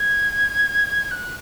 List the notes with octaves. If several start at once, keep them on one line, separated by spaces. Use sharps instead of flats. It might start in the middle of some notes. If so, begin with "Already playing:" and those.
Already playing: G#6
F#6